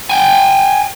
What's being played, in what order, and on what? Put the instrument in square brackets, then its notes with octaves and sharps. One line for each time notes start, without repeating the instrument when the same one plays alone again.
[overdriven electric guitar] G5 G#5